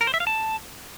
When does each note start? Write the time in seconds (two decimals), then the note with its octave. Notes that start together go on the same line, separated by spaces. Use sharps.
0.01 A#4
0.07 C5
0.14 E5
0.20 F5
0.27 A5